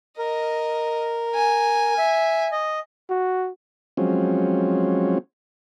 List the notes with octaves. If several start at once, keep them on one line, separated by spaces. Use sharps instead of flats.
A#4 D#5
G#5
E5
D#5
F#4
F3 F#3 G#3 C4 C#4